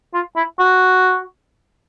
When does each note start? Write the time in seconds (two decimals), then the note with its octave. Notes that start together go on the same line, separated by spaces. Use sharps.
0.14 F4
0.36 E4
0.59 F#4